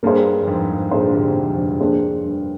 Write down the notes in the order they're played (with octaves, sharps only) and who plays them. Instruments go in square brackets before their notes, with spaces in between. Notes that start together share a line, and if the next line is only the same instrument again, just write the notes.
[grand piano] G2 [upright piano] A#3 D4 G#4 C5
[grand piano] G2
F2 G#2
[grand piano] G2 A#2 [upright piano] A#3 D4 G#4 C5
[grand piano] D3
G#2 C3
F2 G#2
F2
G2
[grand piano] F2 [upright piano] A#3 D4 G#4 C5
[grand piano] G2